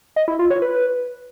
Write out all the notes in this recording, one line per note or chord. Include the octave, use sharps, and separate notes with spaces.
D#5
E4
F4
C#5
B4